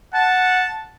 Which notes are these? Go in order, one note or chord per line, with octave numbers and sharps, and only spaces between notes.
F#5 A5